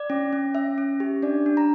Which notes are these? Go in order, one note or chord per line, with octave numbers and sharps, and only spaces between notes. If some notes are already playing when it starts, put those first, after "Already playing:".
Already playing: D5
C#4
C#4
C#4 E5
C#4
G4
D4 D5
D4
A#5